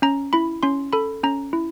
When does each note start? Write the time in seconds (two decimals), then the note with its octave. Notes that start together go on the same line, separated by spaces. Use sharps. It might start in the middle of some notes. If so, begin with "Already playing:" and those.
0.02 C#4 A#5
0.33 E4 B5
0.63 C#4 C6
0.93 A4 B5
1.23 C#4 A#5
1.53 E4